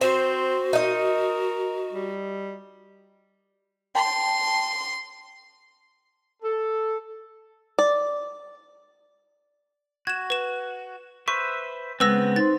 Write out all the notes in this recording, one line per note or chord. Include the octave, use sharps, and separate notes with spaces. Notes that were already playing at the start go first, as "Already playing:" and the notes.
C4 F#4 C5
D#4 A#4 D#5
G3
G5 A5 C6
A4
D5
F#4 G#6 E7
B4 E7
B4 C5 E5 C#6
C#3 G#3 B3 C4 B4 E6 A#6
D#4 C5 C6 A6